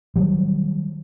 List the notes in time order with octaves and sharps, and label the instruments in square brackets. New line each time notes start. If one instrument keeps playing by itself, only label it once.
[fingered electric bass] D#3 F#3 G3